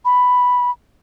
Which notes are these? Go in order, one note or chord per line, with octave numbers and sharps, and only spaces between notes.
B5